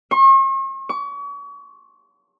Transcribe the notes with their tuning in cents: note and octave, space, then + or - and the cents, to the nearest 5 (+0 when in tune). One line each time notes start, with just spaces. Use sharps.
C#6 -45
C#6 +40